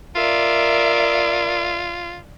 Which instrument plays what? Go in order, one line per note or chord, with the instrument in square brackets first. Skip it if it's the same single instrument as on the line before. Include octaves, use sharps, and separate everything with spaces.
[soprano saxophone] F4 [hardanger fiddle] A#4 D5 [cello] E5